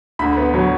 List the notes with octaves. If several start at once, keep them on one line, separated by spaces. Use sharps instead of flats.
D2 B5
B3
F#3